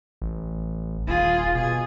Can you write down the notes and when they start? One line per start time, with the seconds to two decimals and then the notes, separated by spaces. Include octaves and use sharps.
0.22 A1
1.07 D#1 F4 G#4
1.55 B2 G#4